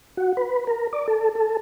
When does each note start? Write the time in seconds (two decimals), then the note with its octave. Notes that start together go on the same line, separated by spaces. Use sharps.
0.17 F#4
0.37 B4
0.67 A#4
0.93 D5
1.08 A4
1.35 A4